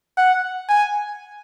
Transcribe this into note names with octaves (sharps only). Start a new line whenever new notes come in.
F#5
G#5